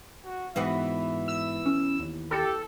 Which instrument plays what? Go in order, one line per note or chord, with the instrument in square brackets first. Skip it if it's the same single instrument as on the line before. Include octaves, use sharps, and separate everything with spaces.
[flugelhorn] F#4
[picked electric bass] G#2 [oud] E3 B3 F#4 [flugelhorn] E5
[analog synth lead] E6
[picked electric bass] C#4
D#2
[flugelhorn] G4 [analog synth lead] A4